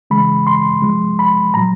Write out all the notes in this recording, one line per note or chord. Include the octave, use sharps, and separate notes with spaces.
C#3 E3 G#3 B5
C6
C3 F3 G#3
B5
A#2 F#3 A#5